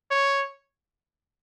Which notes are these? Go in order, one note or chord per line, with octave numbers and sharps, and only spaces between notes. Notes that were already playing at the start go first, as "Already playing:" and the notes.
C#5